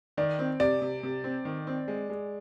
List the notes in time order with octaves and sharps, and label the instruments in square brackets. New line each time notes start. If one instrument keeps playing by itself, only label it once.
[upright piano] D#3 [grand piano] D5
[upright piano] C4
[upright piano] C3 [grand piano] D5
[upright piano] C3
C3
C4
D#3
C4
G#3
G#3